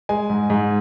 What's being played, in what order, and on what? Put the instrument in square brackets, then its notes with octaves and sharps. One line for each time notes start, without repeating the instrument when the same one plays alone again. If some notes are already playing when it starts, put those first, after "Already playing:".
[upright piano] G#3 G#5
G#2
G#2